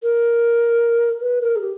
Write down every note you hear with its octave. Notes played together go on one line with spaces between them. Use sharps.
A#4
B4
A#4
G#4
G4